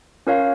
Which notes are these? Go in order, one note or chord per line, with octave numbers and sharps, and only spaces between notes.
C#4 F4 A#4 C#5 F5